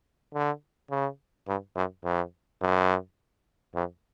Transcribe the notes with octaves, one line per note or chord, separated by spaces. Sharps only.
D3
C#3
G2
F#2
F2
F#2
F2